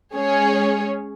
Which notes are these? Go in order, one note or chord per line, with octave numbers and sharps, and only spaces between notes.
G#3 C#4 G#4 C#5